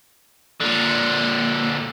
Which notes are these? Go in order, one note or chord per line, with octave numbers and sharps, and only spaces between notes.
A#2 D3